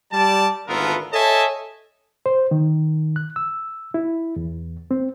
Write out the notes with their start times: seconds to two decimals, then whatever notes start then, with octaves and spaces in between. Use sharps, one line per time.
0.12 G3 D5 A5
0.68 G#1 D2 B3 F4 A4 A#4
1.13 A4 C#5 D#5 E5 G#5 A5
2.26 C5
2.51 D#3
3.16 F#6
3.36 E6
3.94 E4
4.36 E2
4.91 C4